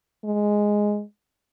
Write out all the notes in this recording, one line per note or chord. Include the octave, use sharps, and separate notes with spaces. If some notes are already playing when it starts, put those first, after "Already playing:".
G#3